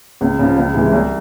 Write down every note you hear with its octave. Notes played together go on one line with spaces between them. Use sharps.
C#2
C#3 F3
C#2
C3 E3 G#3
C2